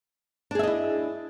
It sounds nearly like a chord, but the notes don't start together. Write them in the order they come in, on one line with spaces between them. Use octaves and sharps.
D4 G#4 E5 D#5 E4